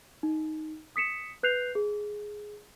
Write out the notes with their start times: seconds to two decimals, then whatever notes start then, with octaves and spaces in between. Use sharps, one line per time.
0.23 D#4
0.96 D#6 B6 C#7 E7
1.43 B4 F#6 G6 C7 F7
1.75 G#4